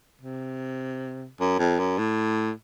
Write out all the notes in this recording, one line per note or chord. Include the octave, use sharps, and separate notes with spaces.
C3
F#2
F2
F#2
A2